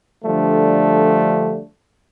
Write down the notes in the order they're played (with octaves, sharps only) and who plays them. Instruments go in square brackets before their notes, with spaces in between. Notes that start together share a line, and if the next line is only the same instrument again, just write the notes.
[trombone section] D3 F3 G3 A3 D4